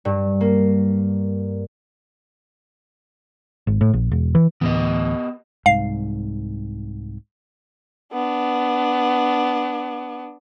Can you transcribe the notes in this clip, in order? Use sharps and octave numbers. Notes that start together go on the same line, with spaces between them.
G2
A#3
G#1
A2
A#1
E1
E3
D2 A2 E3 B3 G4 D#5
C2 G#2 F5 C7
B3 D4